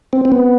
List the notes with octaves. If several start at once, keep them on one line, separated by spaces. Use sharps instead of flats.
C4
C4
B3